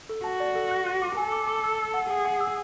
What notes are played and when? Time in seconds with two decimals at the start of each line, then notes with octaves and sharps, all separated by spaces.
0.09 A4
0.24 F#4 A5
0.40 D5
0.55 A4
0.71 F#6
0.86 F#6
1.02 D6
1.17 A4 G#5
1.32 D6
1.47 D6
1.64 E6
1.79 E6
1.94 F#5
2.10 G#4 F#5
2.25 F#5
2.40 E6